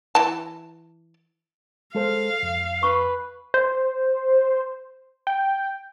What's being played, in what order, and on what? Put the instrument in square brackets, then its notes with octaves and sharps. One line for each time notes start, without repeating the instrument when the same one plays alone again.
[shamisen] E3 A5
[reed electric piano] G#3 A4 C5 [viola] F5
[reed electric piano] F2
[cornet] B4 [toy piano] C#6
[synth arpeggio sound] C5
G5